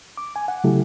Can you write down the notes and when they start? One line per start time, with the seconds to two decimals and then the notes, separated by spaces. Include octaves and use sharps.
0.17 D6
0.36 G#5
0.48 F#5
0.64 C#3 F#3 A3 E4 G4 A4